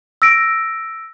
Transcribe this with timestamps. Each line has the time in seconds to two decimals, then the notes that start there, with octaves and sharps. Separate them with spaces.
0.22 E6 A#6 D7